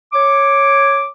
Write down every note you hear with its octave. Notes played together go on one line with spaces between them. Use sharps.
C#5 D6